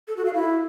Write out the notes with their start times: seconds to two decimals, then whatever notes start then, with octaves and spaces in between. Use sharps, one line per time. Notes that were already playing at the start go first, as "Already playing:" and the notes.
0.08 A4
0.17 F#4
0.25 F5
0.34 E4